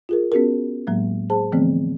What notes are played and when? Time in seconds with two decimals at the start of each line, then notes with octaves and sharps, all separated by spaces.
0.09 F4 G#4 A#4
0.32 B3 C#4 F#4 G#4 A#4
0.87 A2 F#3 G#3 A#3
1.30 G#4 C5 A5
1.52 D3 E3 F3 A3 B3 C4